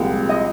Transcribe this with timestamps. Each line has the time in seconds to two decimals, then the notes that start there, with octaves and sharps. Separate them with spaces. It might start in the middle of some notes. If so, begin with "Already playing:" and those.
Already playing: C2 A#2 F3 G#3 G5
0.29 D#5